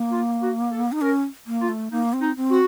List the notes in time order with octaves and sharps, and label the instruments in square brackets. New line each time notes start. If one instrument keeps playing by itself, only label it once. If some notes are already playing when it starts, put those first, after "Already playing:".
Already playing: [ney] A#3
[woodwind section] F4
F#4
A4
[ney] D#4
[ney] C#4 [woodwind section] A#4
[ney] A#3
[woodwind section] F4
[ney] A3
[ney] A#3 [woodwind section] D#4
[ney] C4
[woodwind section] D#4
[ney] C4
[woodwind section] F#4